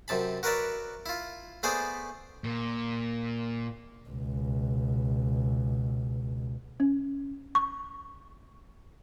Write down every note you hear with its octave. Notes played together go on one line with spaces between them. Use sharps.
F#2 C3 A5 B5
F#4 A#4 B4 C#5 D5 E5
E4 F4
A3 B3 G#4 C5 D5 B5
A#2
C#2 B2
C#4
C#6